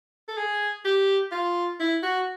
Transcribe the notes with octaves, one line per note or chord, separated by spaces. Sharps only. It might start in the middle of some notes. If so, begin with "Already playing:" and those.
A4
G#4
G4
F4
E4
F#4